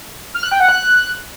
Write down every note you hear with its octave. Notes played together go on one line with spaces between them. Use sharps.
F6
F#6
G5
F#5
F#6